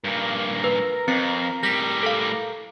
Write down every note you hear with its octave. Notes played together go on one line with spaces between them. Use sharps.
G2 A#2 A#4 A#5
B4
F2 C4 C#7
A2 G3 A#6 B6
A4 F5